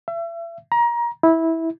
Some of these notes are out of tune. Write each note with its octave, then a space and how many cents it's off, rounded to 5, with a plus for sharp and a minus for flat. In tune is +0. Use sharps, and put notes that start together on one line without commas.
E5 +35
A#5 +25
E4 -15